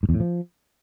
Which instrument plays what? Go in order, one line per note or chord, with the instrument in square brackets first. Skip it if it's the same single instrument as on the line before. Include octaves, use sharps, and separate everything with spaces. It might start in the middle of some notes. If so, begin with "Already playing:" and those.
[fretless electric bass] G#2
E2
A2
F3